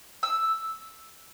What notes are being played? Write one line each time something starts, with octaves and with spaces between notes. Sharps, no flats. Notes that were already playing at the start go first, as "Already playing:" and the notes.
E6